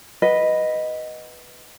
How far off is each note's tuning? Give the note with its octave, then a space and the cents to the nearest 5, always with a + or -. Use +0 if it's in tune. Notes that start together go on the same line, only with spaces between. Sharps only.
B4 +0 D#5 +0 F#5 -5